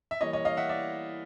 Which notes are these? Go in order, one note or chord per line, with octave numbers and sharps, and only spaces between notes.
E5
E3 G3 A#3 C#5 D#5
C#5 D#5
D#5 F5
E5 F#5
D5 E5